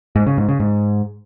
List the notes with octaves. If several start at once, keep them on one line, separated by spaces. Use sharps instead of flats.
G#2
C#3
G#2
C#3
G#2